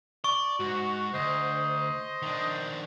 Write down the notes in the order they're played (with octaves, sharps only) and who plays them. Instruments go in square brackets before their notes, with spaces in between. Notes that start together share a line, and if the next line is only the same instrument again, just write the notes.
[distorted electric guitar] D5 [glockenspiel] C#6
[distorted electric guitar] G#2 [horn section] F#4
[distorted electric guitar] D2 [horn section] C5 D#5
[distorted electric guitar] D#3 D4